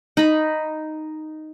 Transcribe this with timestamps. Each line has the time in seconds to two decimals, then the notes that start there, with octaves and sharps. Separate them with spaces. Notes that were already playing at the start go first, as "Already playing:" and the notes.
0.17 D#4 B5